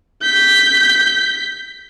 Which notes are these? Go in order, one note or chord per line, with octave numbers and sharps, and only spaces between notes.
G6 B6